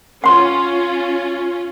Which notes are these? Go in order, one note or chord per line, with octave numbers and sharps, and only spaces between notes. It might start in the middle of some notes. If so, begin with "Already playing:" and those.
C#4 F4 F#5 C6